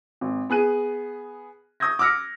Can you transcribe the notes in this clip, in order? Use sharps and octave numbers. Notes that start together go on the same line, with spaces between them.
G#1
B3 G#4 F#6 D#7
C#6 D#6 G6 G#6 A#6
D6 E6 F6 A#6 C#7